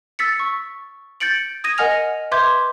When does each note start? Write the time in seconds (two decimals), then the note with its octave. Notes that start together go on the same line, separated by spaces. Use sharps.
0.19 E6 A6 B6 C#7
0.40 C#6
1.20 G6 A6 C#7 D7 F#7
1.64 D#6 G#6 A#6 D#7
1.78 A#4 D#5 F#5 G#5 F6 F7
2.32 B4 E5 C6 D6 G6 G#6